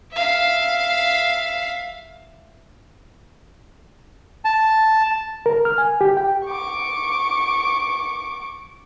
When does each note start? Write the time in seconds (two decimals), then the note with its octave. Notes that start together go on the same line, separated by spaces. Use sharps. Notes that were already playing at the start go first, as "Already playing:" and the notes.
0.12 E5 F5
4.45 A5
5.46 A#4
5.65 F6
5.78 G#5
6.01 G4
6.17 G5
6.46 C#6 D6